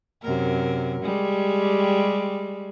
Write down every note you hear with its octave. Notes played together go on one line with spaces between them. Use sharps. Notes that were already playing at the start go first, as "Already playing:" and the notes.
F#2 C3 A#4
G3 G#3 G4